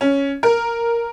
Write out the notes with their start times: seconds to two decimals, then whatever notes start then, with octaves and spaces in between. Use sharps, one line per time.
0.01 C#4
0.43 A#4